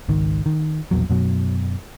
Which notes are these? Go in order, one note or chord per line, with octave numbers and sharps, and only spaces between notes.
G#1 C#2 D#3
D#3
E1 A#1 E2 F#3
F#2 B2 F#3